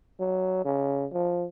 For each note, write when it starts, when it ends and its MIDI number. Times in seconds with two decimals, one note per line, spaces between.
0.20 0.64 54
0.65 1.06 49
1.12 1.46 53